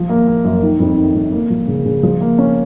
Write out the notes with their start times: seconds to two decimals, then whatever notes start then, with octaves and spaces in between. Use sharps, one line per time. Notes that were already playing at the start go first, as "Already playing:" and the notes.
Already playing: F3
0.09 A#3
0.28 A#3
0.44 F#2
0.62 D#3
0.80 F2
0.97 D#3
1.15 F2
1.32 A#3
1.50 F3
1.68 C#3
1.85 C#3
2.03 F3
2.21 A#3
2.38 C#4